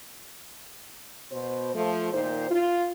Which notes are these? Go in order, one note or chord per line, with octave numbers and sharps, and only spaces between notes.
B2 C5
F3 A3
A#2 D#3 D#4 C5
F4